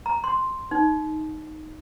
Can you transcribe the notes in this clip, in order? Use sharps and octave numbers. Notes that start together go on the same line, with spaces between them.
A#5
C6
D#4